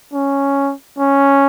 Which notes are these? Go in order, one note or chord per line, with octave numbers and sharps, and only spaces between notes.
C#4
C#4